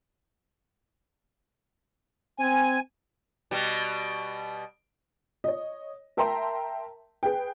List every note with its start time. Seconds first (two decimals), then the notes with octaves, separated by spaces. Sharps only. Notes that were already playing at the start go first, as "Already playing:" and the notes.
2.39 C4 G#5
3.51 B2 G3
5.44 C#5 D#5
6.17 A#4 E5 G5 A5 A#5 C6
7.23 G#4 B4 G5